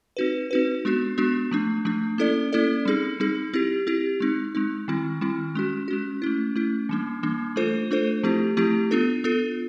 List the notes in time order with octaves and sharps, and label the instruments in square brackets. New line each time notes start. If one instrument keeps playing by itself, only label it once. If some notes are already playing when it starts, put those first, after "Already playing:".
[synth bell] C4 D#4 F#4 B4
C4 D#4 F#4 B4
G#3 B3 D4 F#4
G#3 B3 D4 F#4
F3 A3 D4
F3 A3 D4
A#3 C#4 E4 A4 D5
A#3 C#4 E4 A4 D5
G3 C4 D#4 G#4
G3 C4 D#4 G#4
C4 E4 G4
C4 E4 G4
G#3 C4 D#4
G#3 C4 D#4
D#3 G3 C4 E4
D#3 G3 C4 E4
G#3 C#4 F#4
G#3 C#4 F#4
A3 C#4 E4
A3 C#4 E4
E3 G3 A#3 D4
E3 G3 A#3 D4
A3 D4 F4 A4 C5
A3 D4 F4 A4 C5
F3 A3 C4 E4 G4
F3 A3 C4 E4 G4
B3 D4 F4 A4
B3 D4 F4 A4